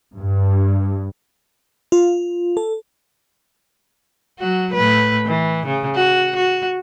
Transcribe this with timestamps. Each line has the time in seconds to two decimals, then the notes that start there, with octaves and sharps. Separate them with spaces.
0.18 G2
1.92 F4
2.57 A4
4.40 F#3 F#4
4.73 A2 B4
5.26 E3
5.66 C#3
5.95 F#4
6.36 F#4